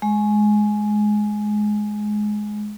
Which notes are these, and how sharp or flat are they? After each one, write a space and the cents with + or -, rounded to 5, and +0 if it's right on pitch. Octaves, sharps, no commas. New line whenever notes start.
G#3 +15